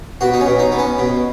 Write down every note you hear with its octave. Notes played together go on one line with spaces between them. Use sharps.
B2 F#4
D#4
C#4
B2
D#4
B3
C#4
B2